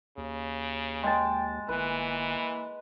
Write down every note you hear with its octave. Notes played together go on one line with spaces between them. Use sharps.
D#2 C#3
G#3 G5 A5
G1 E3 A#3 B4